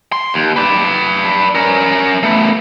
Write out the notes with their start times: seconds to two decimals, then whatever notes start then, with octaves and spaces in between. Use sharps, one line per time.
0.12 C6
0.34 D#2
0.56 B4 D5
1.55 C#4 A#4
2.23 A3 B3